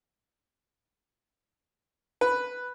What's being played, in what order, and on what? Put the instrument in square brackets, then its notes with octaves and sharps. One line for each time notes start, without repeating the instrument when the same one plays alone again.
[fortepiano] B4